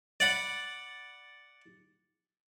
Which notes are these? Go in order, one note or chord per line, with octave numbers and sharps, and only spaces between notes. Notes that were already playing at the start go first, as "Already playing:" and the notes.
D5 F#5 B5